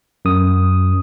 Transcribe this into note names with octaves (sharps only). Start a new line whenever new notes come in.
F#2 D#6